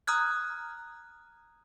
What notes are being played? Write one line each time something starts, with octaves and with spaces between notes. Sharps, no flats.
A#5 D#6 F6 F#6 G#6